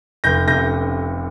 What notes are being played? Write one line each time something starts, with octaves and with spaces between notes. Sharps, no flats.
F1 G6 A#6
C3 G6 A#6